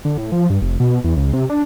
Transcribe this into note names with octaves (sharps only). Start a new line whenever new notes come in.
D3
A2
F3
G2
F1
B2
E2
C#2
C3
D4